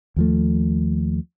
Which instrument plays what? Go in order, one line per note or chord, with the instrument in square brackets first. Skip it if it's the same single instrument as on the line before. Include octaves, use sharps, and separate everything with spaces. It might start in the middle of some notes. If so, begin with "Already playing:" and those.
[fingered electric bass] D#2 F3 A3